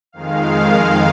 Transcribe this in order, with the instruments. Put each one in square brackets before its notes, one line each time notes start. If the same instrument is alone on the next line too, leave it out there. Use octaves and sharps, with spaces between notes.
[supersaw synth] F2 D#3 G#3 F5